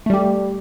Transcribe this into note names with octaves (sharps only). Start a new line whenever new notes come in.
G3 A3 G4